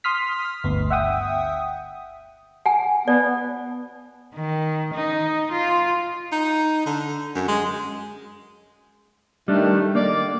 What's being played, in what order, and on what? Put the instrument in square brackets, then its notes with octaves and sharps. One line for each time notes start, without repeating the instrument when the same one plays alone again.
[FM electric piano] C6 D#6 F6 B6
G1 D2 B3
E5 F#5 G5 D#6
[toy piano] F#5 G#5
[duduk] B3 [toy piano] D5
[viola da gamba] D#3
D#4
F4
[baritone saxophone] D#4
D3
F#2
G#3
[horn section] D#3 A3 [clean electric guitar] G3 D4
[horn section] D#3 D5 [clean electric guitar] A#3